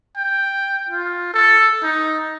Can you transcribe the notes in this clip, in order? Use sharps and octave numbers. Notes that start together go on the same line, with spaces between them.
G5
F4
A4
D#4